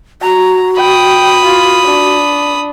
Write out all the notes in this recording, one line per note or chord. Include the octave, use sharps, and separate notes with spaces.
F#4 A#5
G5 B5 D#6
F4
D4